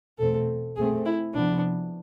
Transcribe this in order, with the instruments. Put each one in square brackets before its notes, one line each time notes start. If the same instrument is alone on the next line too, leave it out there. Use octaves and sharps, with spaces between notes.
[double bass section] E2 B2 A3 C4 [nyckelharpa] A4
[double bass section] B2 A3 C4 [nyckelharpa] G#4
[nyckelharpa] E4
[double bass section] C3 F3 B3 [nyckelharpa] D4